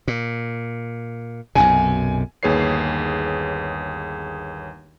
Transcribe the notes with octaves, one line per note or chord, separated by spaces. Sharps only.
A#2
B1 F#2 C3 G#5
G1 D#2 G#4 B4 C#5 C7